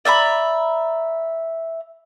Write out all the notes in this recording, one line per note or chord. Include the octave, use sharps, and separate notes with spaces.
D5 E5 A#5 B5